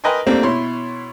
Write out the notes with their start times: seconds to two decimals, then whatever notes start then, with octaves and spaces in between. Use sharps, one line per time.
0.04 A#4 B4 D#5 G5 G#5 C6
0.27 A3 A#3 C4 D4 G4
0.43 B2 E4 C#5 C6